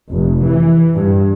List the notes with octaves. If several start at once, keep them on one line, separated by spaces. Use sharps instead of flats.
F1
E3
G2